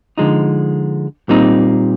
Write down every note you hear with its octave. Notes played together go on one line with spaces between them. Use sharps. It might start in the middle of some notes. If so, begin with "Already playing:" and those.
D3 F3 G#3 D#4
A#2 G3 C4 D#4